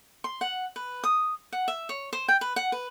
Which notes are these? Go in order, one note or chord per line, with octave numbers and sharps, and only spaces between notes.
C6
F#5
B4
D#6
F#5
E5
C#5
C5
G5
B4
F#5
B4